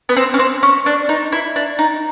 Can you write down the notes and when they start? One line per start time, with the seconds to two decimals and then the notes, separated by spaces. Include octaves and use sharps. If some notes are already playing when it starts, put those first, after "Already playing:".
0.09 B3
0.17 C4
0.34 C#4
0.39 C4
0.63 C#4
0.86 D4
1.09 D#4
1.32 E4
1.56 D4
1.79 D#4